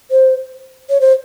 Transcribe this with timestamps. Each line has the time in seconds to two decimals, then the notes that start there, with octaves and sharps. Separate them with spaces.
0.11 C5
0.90 C#5
1.01 C5